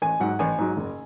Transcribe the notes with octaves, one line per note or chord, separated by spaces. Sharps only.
A1 G#5
G#2 F#3 F#5
A1 G#5
G#2 F#3
F#1